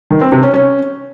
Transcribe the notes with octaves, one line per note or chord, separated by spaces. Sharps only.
D#3
C4
C3
C#4
C#4